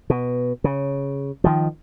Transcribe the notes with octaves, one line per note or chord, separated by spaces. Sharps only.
B2
C#3
D#3 F3